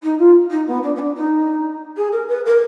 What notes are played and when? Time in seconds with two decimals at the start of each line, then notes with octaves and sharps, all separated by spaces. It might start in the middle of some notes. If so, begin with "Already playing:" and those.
0.02 D#4
0.18 F4
0.50 D#4
0.67 B3
0.83 D4
0.95 B3
0.98 D4
1.16 D#4
1.96 G#4
2.12 A#4
2.28 B4
2.45 A#4